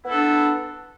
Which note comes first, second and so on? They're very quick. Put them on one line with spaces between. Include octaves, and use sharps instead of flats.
B3 E4 A4 D4